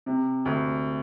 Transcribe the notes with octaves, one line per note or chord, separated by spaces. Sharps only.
C3
D2